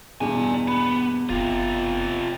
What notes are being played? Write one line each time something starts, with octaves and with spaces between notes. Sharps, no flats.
E2 G2 B2 D5 G#5
B3
F#1 C3 F4